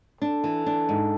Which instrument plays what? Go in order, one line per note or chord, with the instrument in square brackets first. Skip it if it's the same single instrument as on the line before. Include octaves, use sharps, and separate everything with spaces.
[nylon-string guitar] D4 [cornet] A4
[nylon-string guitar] E3
D4
G#2